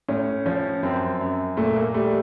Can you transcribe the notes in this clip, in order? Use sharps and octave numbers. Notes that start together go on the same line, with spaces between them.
A2 C#4
F3 C#4
F#2 C4
F#2
A#2 A3
A#3
G3 A3